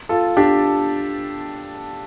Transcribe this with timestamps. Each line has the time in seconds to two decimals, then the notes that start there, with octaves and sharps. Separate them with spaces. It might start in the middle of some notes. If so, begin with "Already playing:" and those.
0.09 F4 A4
0.37 D4 G4